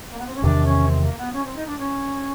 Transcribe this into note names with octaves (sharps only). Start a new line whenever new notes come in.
A#3
B3
C4
C#4
E2 C3 D#3 D4
C#4
C4
A#3
B3
C#4
C4
D#4
D4
C#4